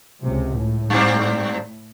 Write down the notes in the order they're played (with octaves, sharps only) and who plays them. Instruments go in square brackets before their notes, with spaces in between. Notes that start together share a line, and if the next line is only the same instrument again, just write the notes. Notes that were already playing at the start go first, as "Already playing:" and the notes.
[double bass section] C#2 C3
A2
[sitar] G2 G3 C4